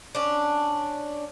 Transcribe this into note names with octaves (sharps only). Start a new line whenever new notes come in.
C#4 D4